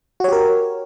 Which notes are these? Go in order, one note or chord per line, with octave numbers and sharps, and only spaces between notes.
F#4 G4 A#4 C#5